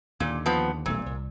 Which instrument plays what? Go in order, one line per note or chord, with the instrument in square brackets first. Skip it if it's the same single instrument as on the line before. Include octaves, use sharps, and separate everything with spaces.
[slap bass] D#2 D3 [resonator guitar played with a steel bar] A#2
[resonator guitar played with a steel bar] F3 B3
[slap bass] D#1 B1 A3 [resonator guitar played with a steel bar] A#2
[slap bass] C2